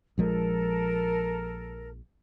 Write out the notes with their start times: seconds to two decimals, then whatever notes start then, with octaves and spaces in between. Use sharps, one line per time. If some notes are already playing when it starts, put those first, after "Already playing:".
0.18 A#1 F3 G#3 A4 A#4